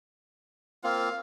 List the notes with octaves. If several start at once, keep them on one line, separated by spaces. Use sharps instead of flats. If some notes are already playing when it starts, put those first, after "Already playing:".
A#3 C4 F4 F5